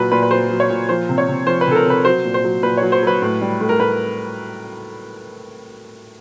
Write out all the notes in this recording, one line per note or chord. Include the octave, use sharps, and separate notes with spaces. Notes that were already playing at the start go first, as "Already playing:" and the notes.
Already playing: A#2 F#3 B4
A#2 B4
B4
F#3 C5
F#3
C#5
A#2
F3 C5
C3
C#5
C3
F3 C5
B4
C3 A4
A#4
C3 B4
F#3 C5
A#2
C5
F#3
A#2 B4
F#3 C#5
C5
F#3 B4
A2
G3
A2
A#4
A2 B4